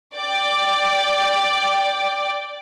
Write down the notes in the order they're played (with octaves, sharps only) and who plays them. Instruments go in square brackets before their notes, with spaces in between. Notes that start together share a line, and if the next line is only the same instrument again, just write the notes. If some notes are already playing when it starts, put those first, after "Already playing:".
[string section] D5 G5 D6